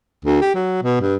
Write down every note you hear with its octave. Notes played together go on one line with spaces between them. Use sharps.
D2
G4
F#3
B2
G2